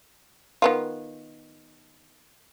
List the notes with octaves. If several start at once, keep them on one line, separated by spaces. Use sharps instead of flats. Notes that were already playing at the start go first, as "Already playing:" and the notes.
D#3 B3 F4